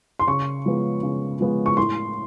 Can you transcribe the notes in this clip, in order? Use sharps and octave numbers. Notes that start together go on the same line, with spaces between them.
C6
C#3 C#6
F3 G#3 B3
C#3
F3 G#3 B3
C#6
A2 C6